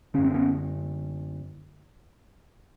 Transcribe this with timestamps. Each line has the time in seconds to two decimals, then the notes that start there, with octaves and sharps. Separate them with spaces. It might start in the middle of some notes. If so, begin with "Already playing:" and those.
0.14 F#2 D3 C#4
0.24 C4
0.34 B3 C#4